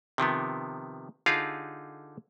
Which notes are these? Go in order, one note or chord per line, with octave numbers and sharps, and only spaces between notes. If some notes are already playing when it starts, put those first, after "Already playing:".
C3 D#3 F3 B3
D3 D#4 F4 G4 G#4 F5